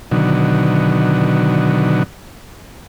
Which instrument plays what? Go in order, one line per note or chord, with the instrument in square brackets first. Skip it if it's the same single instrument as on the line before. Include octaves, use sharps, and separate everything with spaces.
[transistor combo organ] B2 D3 D#3 F#3